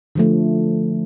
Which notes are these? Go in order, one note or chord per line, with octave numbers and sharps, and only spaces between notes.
D3 F3 A3